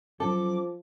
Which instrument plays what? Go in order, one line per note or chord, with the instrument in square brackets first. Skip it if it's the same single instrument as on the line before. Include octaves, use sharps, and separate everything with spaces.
[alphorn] F3 [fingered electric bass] F#3 C#4 [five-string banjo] A4 [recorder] D6